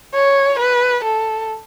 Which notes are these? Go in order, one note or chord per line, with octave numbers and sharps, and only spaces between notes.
C#5
B4
A4